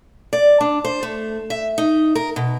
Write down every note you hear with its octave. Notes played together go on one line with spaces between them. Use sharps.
D5
D4
C5
A3
E5
D#4
A#4
B2